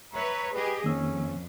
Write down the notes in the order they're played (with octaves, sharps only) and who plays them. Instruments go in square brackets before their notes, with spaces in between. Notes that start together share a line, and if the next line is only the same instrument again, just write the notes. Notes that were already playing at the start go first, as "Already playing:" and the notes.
[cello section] B4 C#5 E5 [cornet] A#5
[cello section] G4 G#4 D#5 [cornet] B4
[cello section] F2 [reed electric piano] D#3 A#3 E6 [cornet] C#4